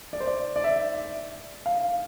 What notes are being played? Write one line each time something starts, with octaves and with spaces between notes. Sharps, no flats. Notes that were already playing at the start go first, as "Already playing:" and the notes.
D5
C5
D5
D5
E5
F5